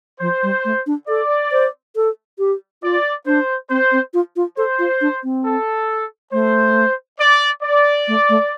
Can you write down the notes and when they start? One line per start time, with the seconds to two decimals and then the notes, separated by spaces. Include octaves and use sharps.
0.20 F3 C5
0.43 G3
0.65 A3
0.86 D4
1.08 A4 D5
1.52 C5
1.96 A4
2.39 G4
2.83 F4 D5
3.26 D4 C5
3.70 C4 C5
3.92 C4
4.14 F4
4.36 F4
4.57 A4 C5
4.79 F4
5.01 D4
5.23 C4
5.45 A4
6.32 A3 C5
7.20 D5
7.63 D5
8.08 A3
8.29 A3